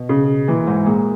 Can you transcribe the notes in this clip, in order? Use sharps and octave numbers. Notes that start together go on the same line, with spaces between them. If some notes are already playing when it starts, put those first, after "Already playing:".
Already playing: B2
C#3
A#2 E3
G#2
A#2 G#3